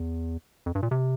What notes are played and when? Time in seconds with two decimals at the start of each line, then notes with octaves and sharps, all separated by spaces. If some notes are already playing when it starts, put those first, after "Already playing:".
Already playing: E2
0.66 F2
0.75 G2
0.83 A#2
0.91 C3